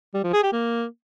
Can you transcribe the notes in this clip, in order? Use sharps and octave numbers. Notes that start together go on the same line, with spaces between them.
G3
F3
G#4
G4
A#3